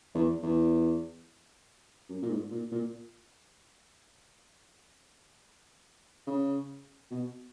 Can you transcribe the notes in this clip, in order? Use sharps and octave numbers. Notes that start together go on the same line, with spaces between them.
E2
E2
F#2
A#2
G#2
A#2
A#2
C#3
B2